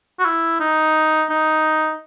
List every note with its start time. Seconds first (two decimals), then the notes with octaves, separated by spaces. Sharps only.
0.19 F#4
0.25 E4
0.60 D#4
1.30 D#4